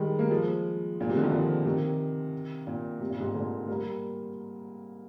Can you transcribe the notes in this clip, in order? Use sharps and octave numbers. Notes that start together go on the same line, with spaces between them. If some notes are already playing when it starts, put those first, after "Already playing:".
Already playing: D#3 G3 G#3
A#3
F3 G#3
A#2
C3
D3
D#3
D3 F3
C3 D#3
A#2
C3
A#2
G#2 C3
A#2 D3
G3 A#3